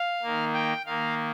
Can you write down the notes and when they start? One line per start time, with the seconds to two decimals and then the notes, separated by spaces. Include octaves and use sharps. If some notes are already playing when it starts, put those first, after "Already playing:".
Already playing: F5
0.22 D#3 A#3
0.54 G5
0.86 D#3 A#3 F5